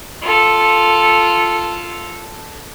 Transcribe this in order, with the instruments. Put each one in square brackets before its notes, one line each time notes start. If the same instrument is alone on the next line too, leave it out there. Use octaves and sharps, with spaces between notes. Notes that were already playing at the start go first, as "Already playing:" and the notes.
[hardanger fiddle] F4 A4